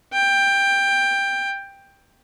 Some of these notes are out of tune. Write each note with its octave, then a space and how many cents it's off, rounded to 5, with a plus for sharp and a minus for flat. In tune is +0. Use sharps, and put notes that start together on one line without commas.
G5 +15